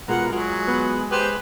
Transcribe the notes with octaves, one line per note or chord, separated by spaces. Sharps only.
B2 G#3 F4 G#4 A#4 F#5
F#3 G#3 F4 F#4 A#4
B3
G4 B4 C5